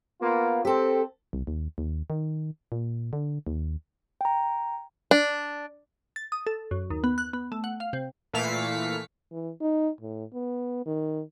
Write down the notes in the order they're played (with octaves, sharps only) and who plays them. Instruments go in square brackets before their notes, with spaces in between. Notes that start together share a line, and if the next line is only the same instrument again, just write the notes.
[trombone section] A#3 B3 F4
[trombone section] C4 [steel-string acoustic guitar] G4 A4
[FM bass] C2
D#2
D#2
D#3
A#2
D3
D#2
[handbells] G5 A#5
[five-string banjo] D4
[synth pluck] A6
D#6
A4
F#2
D#2
B3
F#6
B3
A3
F#5
F5
C3
[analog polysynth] A#2 E3 A3 F5 B6 C#7
[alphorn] E3
D#4
A2
B3
D#3